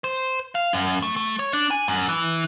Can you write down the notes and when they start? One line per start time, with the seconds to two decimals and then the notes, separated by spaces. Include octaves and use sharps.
0.04 C5
0.55 F5
0.73 F#2
1.02 A3
1.16 A3
1.39 C#5
1.53 D4
1.71 G#5
1.88 F#2
2.09 E3